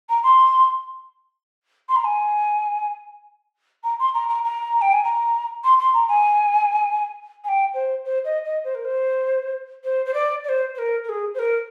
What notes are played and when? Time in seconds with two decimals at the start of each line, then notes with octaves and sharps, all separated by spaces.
0.09 A#5
0.23 C6
1.89 C6
1.96 A#5
2.04 G#5
3.83 A#5
3.99 C6
4.14 A#5
4.28 A#5
4.44 A#5
4.81 G5
4.92 G#5
5.04 A#5
5.64 C6
5.79 C6
5.93 A#5
6.08 G#5
7.44 G#5
7.48 G5
7.74 C5
8.04 C5
8.24 D#5
8.44 D#5
8.64 C5
8.74 A#4
8.85 C5
9.84 C5
10.05 C5
10.13 D5
10.44 D5
10.48 C5
10.74 C5
10.78 A#4
11.04 A#4
11.09 G#4
11.34 C5
11.39 A#4